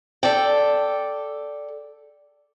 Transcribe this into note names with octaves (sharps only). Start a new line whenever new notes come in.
A4 D5 G5